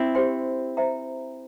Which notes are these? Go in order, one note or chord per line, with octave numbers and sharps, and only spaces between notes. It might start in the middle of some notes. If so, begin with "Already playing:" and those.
Already playing: C4 E4
G4 C5 G5 C6
C5 E5 G5 A#5